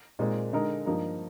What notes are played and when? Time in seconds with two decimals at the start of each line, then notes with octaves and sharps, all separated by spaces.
0.19 A#2 G#3 C4 D#4
0.53 D3 G#3 D#4 A#4
0.86 G2 F3 A#3 D#4